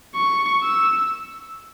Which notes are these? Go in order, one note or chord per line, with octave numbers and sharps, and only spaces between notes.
C#6
E6